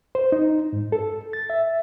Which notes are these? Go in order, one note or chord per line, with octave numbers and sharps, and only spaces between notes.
C5
D#4
G#2
A4
A6
E5